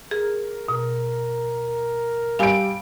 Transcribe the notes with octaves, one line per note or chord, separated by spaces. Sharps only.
G#4 A#4
B2
G3 F5 G#5 E6 D7